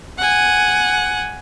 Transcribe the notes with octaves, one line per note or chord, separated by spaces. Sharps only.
F#5 G#5